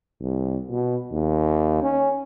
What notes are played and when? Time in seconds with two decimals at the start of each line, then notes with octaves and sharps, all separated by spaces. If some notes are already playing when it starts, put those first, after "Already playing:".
0.21 C2
0.70 B2
1.12 D#2
1.82 C#4